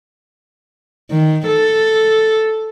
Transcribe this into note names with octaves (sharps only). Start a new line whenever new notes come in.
D#3
A4